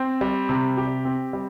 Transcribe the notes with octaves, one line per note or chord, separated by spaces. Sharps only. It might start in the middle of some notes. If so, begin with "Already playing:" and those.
Already playing: C4
G3
C3
G4
C4
G3